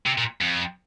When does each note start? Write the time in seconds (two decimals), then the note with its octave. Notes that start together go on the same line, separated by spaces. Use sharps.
0.06 C3
0.18 A#2
0.41 F2